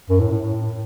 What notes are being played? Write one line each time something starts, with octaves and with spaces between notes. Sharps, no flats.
F#2
A2
A2
A2